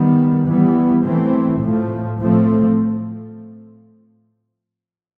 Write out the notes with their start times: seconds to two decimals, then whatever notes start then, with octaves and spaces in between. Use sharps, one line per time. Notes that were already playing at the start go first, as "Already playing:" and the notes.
Already playing: D#3 G3 B3
0.47 E3 G3 B3
1.04 E3 A3 C4
1.61 A2 F3 A3
2.19 A2 F3 A3 C4